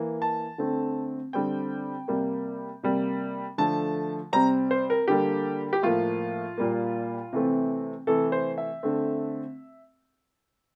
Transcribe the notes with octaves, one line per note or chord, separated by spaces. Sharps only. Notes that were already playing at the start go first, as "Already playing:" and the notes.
Already playing: E3 A#3
A5
D3 A3 C4
D3 G3 C4 G5
C3 G3 A#3
C3 G3 A#3
D3 F3 A3 A5
C3 G3 C4 A#5
C5
A#4
D3 G3 A#3 G4
G4
A2 F3 A#3 F4
A#2 G3 A#3
C3 E3 A3 C4
C3 E3 A3 A4
C5
E5
D3 A3 C4